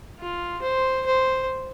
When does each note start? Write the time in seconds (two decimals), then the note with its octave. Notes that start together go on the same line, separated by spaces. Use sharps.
0.20 F4
0.62 C5
1.06 C5